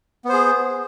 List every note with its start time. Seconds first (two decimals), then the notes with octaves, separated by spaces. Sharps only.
0.25 B3
0.29 C5
0.33 G#4